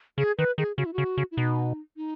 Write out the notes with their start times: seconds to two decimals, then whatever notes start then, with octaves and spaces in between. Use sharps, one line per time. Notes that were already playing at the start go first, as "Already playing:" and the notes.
0.18 C#3 G#4
0.38 D#3 B4
0.58 D#3 G#4
0.77 C#3 F#4
0.86 E4
0.93 C#3 F#4
1.17 C#3
1.31 E4
1.37 B2 D#4
1.97 D#4